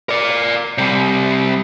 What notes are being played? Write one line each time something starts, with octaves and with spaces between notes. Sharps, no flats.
A#4 D5
C3 G3